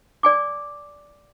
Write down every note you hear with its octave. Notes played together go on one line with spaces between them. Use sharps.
D5 G#5 D6